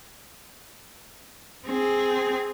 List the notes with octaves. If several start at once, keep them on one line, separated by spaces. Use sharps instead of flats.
C4 G#4